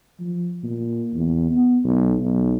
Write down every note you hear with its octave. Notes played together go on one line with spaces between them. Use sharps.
F3
A#2
E2
B3
B1
B1